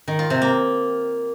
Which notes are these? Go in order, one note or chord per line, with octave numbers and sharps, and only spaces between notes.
D#3
F4
C3
A#3